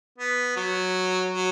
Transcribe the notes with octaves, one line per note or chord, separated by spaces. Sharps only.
B3
F#3
F#3